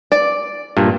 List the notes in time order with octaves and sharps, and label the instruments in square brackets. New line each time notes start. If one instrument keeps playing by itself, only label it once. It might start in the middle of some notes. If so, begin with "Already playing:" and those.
[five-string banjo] D5
[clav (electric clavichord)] G2 A#2